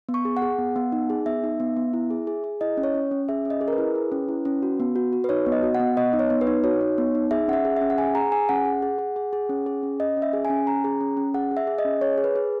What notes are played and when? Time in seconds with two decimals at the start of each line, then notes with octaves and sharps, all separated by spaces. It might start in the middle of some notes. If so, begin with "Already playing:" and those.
0.09 B3
0.14 C#6
0.25 G#4
0.37 F#5
0.42 G#4
0.59 B3
0.76 B3
0.92 D#4
1.10 G#4
1.26 B3 E5
1.44 D#4
1.60 B3
1.76 B3
1.93 E4
2.11 G#4
2.27 G#4
2.44 G#4
2.61 E4 D#5
2.77 C#4
2.84 C#5
2.94 C#4
3.11 C#4
3.29 G#4 E5
3.45 C#4
3.50 D#5
3.61 G#4
3.68 A#4
3.73 B4
3.78 E4
3.95 G#4
4.12 C#4
4.28 E4
4.45 C#4
4.63 F#4
4.80 B3
4.96 F#4
5.13 F#4
5.24 B4
5.29 D#4 C#5
5.46 B3
5.52 D#5
5.63 F#4
5.75 F#5
5.80 B3
5.97 B3 D#5
6.13 D#4
6.19 C#5
6.30 B3
6.41 B4
6.47 D#4
6.64 F#4 C#5
6.81 D#4
6.98 B3
7.15 D#4
7.31 G#4 E5
7.48 C#4 F#5
7.53 E5
7.65 G#4
7.76 C#4 E5
7.90 F#5
7.98 G#4 G#5
8.15 G#4 A#5
8.32 G#4 G#5
8.49 C#4 F#5
8.65 G#4
8.82 G#4
8.98 G#4
9.16 G#4
9.33 G#4
9.49 C#4
9.66 G#4
9.83 C#4
10.00 C#4 D#5
10.17 C#4
10.22 E5
10.33 G#4
10.45 G#5
10.50 C#4
10.67 C#4 A#5
10.84 G#4
11.01 C#4
11.17 C#4
11.34 G#4 F#5
11.51 G#4
11.57 E5
11.67 G#4
11.78 D#5
11.85 C#4
12.01 G#4 C#5
12.18 G#4
12.24 B4
12.36 G#4